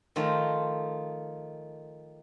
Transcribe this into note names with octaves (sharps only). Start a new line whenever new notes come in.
D#3 F3 A3 F4 D#5